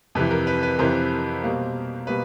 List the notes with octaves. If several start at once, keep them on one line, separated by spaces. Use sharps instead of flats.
F2 C3 E3 B4
A#4
B4
B4
F2 C3 E3 A#4 C5
B2 G3 A#3
B2 G3 A#3 B4